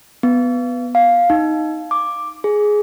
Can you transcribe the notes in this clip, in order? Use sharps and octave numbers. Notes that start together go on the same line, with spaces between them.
B3
F5
D#4
D6
G#4